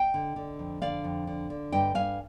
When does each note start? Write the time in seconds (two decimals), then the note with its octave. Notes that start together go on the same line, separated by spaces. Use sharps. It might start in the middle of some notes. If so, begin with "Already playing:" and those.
Already playing: D#5 G5
0.14 D3
0.36 D3
0.59 F2
0.82 D3 D5 F5
1.04 F2
1.27 D3
1.50 D3
1.72 G2 D#5 G5
1.95 G2 F5 G#5